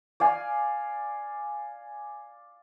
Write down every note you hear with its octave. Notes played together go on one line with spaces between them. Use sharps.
D5 F5 G#5